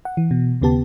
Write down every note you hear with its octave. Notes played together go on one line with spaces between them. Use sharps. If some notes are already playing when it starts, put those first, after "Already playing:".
F#5
E3
B2
D#2 C#3 B3 G4 A5